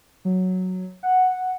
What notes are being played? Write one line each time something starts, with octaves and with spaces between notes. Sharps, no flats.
F#3
F#5